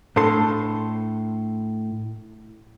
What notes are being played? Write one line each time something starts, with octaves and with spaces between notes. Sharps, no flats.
A2 D4 A4 C6